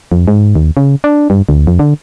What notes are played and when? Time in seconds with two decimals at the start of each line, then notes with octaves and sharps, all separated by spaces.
0.12 F2
0.28 G#2
0.55 D#2
0.77 C#3
1.04 D4
1.30 G2
1.49 D2
1.67 F2
1.79 D3